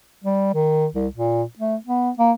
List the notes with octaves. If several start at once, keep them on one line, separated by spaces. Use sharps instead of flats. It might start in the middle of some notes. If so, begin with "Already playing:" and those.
G3
D#3
C2
A#2
A3
B3
A#3